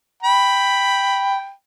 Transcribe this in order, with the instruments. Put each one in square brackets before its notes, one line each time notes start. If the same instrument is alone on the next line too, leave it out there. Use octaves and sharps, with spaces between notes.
[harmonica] G5 B5